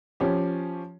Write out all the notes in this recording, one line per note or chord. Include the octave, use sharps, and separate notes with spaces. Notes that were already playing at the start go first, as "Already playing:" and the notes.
F3 C#4 G4 C#5